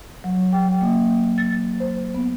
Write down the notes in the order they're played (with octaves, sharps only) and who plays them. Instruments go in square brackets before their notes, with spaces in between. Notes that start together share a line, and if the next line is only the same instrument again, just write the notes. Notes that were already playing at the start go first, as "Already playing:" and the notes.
[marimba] F#3
G5
A#3
A6
C5
B3